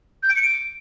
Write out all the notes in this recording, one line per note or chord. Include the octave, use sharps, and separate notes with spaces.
G6
D7
C#7
D7